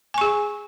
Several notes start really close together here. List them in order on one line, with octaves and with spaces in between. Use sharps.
G#5 C#6 G#4